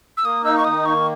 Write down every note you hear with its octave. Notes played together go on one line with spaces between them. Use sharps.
E6
A#3 D#6
D#4 E6
C#6
D#3 D#6
A#3 C#6